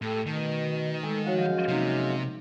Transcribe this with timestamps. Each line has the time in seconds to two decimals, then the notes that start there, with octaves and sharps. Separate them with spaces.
0.02 A2 G4 A4
0.26 B2 D#3 A3
1.03 G#3 A4
1.26 F3 F#4 C#5 F5 F#5
1.38 F#2 F#3 G#3 F5 G6
1.68 C3 A#3 D#4 G#4